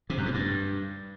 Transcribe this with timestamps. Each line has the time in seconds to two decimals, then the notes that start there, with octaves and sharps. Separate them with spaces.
0.10 C3
0.18 F#2
0.26 G#2
0.34 G2